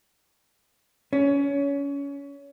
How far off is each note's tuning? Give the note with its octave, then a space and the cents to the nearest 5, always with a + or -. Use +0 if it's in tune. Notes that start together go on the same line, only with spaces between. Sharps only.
C#4 +25